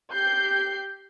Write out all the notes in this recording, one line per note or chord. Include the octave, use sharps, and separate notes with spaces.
G4 G6 C7